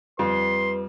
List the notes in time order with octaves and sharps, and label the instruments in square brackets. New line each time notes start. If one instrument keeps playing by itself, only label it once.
[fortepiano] F2 [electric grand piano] G3 [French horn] B4 [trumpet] C6